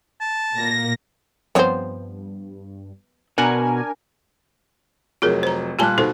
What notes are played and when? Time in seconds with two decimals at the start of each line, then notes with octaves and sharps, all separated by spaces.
0.20 A5
0.57 A#2 A#3 A#6
1.55 G2 F3 B3 C4 C5 C#5
3.38 B2 D4 A#4 F#5 G#5
5.22 F1 F#3 F4 G#4 A#4
5.43 C5 A#5
5.79 A#2 G3 G4 G#5 A5 F#6
5.98 B2 D#4 A4 C5